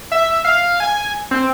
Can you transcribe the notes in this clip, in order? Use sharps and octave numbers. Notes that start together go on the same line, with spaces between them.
E5
F5
G#5
C4